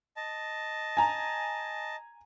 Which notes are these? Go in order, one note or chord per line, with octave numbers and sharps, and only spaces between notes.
D#5 A5
G#5 A#5